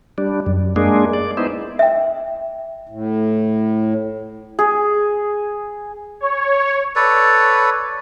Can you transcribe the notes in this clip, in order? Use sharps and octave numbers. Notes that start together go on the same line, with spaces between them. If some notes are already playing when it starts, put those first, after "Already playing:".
G3 D4
F#2
G#3 A#3 D4 G#4
D5
B3 D#4 E4 C5
E5 G5
A2
G#4
C#5
A4 B4 C#5 D5